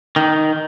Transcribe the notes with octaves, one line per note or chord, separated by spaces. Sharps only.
D#3